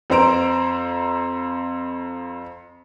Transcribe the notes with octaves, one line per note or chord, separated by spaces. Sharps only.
F2 C4 C5 A#5 D7